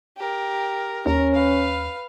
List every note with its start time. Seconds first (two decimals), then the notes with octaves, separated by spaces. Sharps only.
0.18 G4 A#4
1.06 D#2 C#4 A#4
1.35 B4 F5